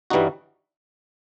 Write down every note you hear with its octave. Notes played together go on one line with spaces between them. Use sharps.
G2 E3 G3 D#4 F#4